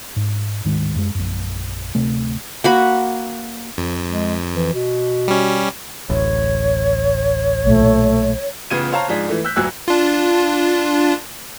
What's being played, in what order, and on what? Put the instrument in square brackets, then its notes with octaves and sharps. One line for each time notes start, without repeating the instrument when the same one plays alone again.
[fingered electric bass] G#2
D1 G#2 D#3 G#3
F#2 G#3
A#1 F#2
D1 C3 A3
[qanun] A#3 F#4 B5
[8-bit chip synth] F2 [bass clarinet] F3
[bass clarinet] G#3
E3
B2
[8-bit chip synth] G3 C#4
[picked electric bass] D1 A1 [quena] C#5
[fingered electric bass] B1 A#2 [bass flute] A3
[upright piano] A1 C#3 B3 F4 G#6 D#7
C5 C#5 F5 A5 A#5
G#2 F3 D4 F4 G#4 B6
E3 A3
E6 F#6 G6 B6
A1 D2 F#3 G#5 E6 F#6
[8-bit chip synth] D4 F4